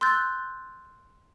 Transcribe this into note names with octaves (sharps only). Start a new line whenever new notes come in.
C6 E6 F#6 G6 A6